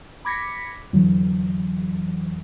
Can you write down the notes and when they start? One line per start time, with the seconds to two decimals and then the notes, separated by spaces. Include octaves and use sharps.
0.25 B5 D6 G#6 A#6 B6 C#7
0.93 F2 D3 E3 F#3